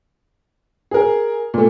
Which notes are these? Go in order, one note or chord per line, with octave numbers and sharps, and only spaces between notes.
G#4 A#4
A#2 A3